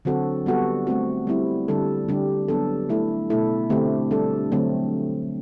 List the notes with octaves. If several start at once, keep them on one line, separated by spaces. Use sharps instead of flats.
D3 F#3 C4 F#4 A4
G3 B3 F#4 A4
A3 C4 F#4
G3 C4 E4
D3 G3 D4 A4
D3 G3 D4 G4
F#3 B3 D4 A4
A3 E4 A4
B2 A3 E4 A4
D3 A3 C4 G4
G3 D4 A4
D3 F#3 A3 C4